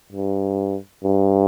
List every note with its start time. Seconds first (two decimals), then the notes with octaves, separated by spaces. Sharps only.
0.12 G2
1.04 G2